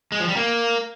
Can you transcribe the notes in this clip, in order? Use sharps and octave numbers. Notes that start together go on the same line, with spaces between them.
G#3
F3
G3
A#3